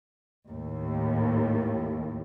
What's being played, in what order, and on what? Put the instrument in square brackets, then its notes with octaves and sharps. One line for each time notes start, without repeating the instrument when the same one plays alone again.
[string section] D#2 A2